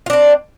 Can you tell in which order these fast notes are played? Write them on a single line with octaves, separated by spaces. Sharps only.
F4 D4 C4